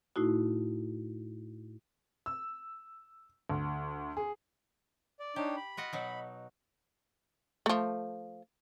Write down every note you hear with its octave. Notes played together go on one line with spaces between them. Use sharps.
A2 A3 D#4 E4 F#4
E6
D2
G#4
D5
D4 D#4 G4 C#5
B5
F4 F#4 D#5
B2 F#3 D#4
F3 A3